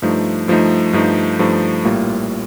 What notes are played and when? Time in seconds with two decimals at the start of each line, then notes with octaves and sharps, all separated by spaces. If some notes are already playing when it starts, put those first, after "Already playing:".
0.02 G2 F3 A3 D#4
0.48 G2 F3 A3 D#4
0.93 G2 F3 A3 D#4
1.39 G2 F3 A3 D#4
1.85 A#1 A2 G3 A#3 F4